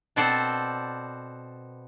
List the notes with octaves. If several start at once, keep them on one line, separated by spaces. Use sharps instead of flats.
B2 B3 C4 A4 C5 D5